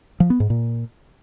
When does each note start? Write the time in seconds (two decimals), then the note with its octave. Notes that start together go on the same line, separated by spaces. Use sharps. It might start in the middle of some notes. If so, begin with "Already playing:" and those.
0.20 F3
0.30 B3
0.40 G#2
0.50 A#2